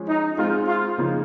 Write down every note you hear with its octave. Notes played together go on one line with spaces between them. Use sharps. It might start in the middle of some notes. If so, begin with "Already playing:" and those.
Already playing: F3 G#3 C#4 G#4
D#4
G#3 C4 D#4 F4
F4
C#3 F3 A#3 D#4